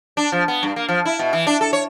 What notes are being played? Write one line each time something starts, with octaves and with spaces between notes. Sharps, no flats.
D4
F3
B3
G2
A#3
F3
E4
B2
E3
D4
A4
C#5